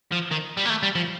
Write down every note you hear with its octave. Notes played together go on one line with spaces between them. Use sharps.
F3
D#3
G3
A#3
A3
G3
F3